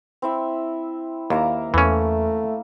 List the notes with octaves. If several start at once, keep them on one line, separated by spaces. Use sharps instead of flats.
C4 E4 E5
D#2 A#3 E5 A#5
E2 E3 A3 C#4